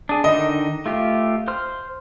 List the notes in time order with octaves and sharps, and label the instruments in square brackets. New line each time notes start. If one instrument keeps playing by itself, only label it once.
[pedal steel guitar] D4 G#4
[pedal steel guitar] D3 D#3 D#4 [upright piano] D#5
[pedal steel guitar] A3 F4 G4
C5 C6 F6